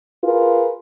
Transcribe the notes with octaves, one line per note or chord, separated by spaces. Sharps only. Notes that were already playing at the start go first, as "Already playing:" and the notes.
F4 G#4 A#4 B4